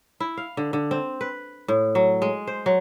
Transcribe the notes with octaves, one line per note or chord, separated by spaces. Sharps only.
E4
F5
D3
D3
C4
B4
A2
F#3
G#3
C5
F#3